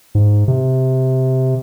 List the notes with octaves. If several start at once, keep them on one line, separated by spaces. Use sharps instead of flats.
G#2
C3